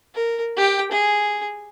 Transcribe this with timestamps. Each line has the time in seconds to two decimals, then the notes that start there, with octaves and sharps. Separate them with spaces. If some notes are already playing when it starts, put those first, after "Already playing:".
0.15 A#4
0.57 G4 G5
0.91 G#4